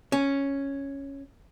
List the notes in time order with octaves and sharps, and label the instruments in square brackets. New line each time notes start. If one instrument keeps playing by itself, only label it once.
[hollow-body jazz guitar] C#4